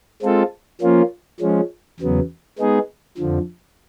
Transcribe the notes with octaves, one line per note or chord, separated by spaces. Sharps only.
G#3 C4 F4 A4
F3 A#3 C#4 F4
F3 G#3 C#4
E2 C#3 F#3 B3
G#3 B3 D#4 G#4
F2 D3 F3